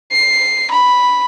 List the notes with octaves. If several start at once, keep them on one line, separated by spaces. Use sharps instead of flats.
C7
B5